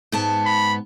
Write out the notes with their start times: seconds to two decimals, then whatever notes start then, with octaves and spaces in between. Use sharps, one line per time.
0.12 G#2 B3 A5
0.46 B5